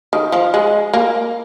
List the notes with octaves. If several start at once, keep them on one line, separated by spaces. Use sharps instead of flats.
D#3
F3
G#3
A#3